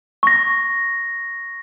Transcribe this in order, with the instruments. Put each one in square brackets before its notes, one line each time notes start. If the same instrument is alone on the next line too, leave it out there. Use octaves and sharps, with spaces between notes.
[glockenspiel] C#6 A#6